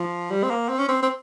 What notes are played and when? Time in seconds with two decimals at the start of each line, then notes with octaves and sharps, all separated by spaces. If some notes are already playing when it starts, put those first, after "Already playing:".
Already playing: F3
0.30 G3
0.43 C4
0.51 A#3
0.69 C4
0.79 C#4
0.89 C4
1.03 C4